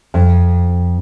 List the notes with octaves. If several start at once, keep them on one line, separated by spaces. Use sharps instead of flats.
F2